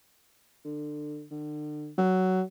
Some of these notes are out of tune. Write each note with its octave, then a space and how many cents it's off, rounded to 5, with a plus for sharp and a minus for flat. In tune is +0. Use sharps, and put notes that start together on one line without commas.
D3 +25
D3 +40
F#3 +10